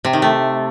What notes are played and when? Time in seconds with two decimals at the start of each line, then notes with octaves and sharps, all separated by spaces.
0.05 C3
0.13 D#3
0.22 A3